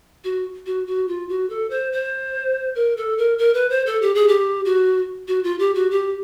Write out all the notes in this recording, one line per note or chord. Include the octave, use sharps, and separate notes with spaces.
F#4
F#4
F#4
F4
F#4
A4
C5
C5
A#4
A4
A#4
A#4
B4
C5
A4
G4
G#4
G4
F#4
F#4
F4
G4
F#4
G4